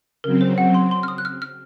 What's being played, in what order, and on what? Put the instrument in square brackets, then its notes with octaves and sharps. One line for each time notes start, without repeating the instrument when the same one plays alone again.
[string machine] C#3 F#3 C4 [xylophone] A#4
[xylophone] C5
F#5
C6
C6
F6
D#6
F#6
F6
F6